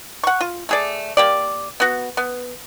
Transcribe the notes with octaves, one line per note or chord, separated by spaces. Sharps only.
F#5 C#6
F4
A3 G#4 D5
A#3 G4 D5
B3 F#4
B3